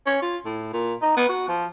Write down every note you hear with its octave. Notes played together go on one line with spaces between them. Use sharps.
C#4
F4
A2
A#2
D#4
B3
F#4
F3